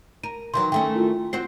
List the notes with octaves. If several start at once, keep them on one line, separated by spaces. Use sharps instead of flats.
A#4 D#7
D#3 E3 F#3 C6
D#3 A3 C#4 G5
E4 F4
C4 F#4 C5 C7